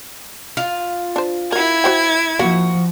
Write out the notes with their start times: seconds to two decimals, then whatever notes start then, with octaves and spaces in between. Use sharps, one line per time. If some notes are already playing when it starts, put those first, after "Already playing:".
0.57 F4 F5
1.16 D4 C5
1.52 E4 F#4 A#4 G#6
1.84 F#4 C5 G5
2.39 F3 A#3 F4 F#4